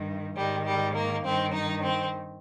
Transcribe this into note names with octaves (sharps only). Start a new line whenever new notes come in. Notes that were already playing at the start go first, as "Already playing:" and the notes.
Already playing: G2 D#3
G#2 D#3 G3
G3
A#3
G2 D#3 C4
D#4
C4